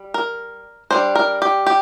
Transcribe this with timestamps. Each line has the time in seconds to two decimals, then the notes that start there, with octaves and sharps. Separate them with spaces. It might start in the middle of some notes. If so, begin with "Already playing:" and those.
Already playing: G3
0.14 A#4
0.91 G3 D4 C5
1.15 A#4
1.42 G4
1.66 G4